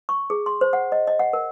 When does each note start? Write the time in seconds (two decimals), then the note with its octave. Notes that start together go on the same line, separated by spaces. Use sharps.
0.09 C#6
0.30 G#4
0.46 C6
0.61 C5
0.73 F#5
0.92 D#5
1.07 D#5
1.19 F#5
1.33 A#4